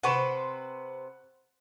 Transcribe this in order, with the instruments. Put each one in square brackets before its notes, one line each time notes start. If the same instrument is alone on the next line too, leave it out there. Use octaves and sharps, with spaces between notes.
[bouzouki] C3 B4 C5 [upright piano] F#5 C#6 E7